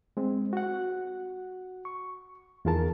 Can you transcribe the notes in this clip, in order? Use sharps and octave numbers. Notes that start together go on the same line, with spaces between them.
G#3 C4
F#4 F#5
C#6
E2 D#3 F4 G#4 A#4 A5